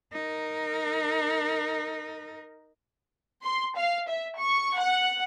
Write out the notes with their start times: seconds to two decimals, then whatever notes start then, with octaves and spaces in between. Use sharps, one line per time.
0.13 D#4 A#4
3.43 C6
3.76 F5
4.08 E5
4.38 C#6
4.79 F#5